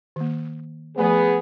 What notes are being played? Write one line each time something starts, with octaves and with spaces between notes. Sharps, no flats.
D#3 A#3
F3 A3 B3 G#4